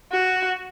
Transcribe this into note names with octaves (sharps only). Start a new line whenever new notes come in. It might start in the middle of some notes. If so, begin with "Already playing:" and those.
F#4